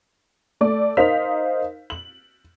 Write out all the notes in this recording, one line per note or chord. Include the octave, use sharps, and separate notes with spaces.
A3 D5
D#4 A#4 C5 F5 B6 F7
F#7